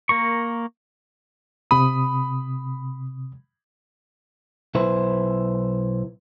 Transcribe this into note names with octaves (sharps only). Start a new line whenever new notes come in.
A#3 A#4 C#6
C3 B5 D#6
B1 E4 B4 C5